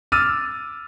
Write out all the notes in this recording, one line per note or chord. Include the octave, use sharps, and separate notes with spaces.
D6 E6 F6 A6 D#7